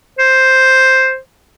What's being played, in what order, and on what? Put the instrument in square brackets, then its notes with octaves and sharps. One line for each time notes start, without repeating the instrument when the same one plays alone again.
[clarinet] C5